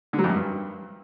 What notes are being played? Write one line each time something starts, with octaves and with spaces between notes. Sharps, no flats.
D3
F#3
F2
F#2
G2